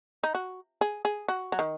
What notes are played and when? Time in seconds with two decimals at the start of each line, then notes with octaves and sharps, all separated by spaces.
0.24 D#4
0.35 F#4
0.81 G#4
1.05 G#4
1.28 F#4
1.52 F#3
1.59 D#3